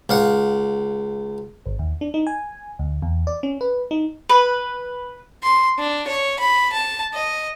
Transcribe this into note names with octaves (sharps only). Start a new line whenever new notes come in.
C#2 F5 F#5
G#1
D#2
D4
D#4
G#5
D2
E2
D5
C#4
B4
D#4
B4
C6
D4
C#5
B5
A5
D#5